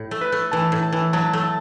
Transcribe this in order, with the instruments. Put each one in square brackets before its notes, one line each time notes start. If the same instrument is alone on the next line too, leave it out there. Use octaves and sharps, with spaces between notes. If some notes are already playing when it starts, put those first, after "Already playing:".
Already playing: [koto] A2
A3
[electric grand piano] B4
[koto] A3
[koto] E3 [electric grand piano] A5
[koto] A2
[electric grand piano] A5
[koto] E3
[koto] F#3 [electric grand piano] A5
[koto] A3
[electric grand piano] A5